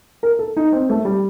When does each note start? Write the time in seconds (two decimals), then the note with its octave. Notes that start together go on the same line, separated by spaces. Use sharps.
0.23 A#4
0.39 A4
0.57 D#4
0.72 C4
0.89 A3
1.05 G3